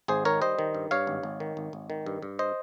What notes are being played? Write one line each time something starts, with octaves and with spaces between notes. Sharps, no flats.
G#1 G#4 C5
D#3 A#4 C#5
G3 C5 D#5
D#3
G2
G2 C#5 F5
G#1
G#1
D#3
G#1
G#1
D#3
G2
G2
C5 D#5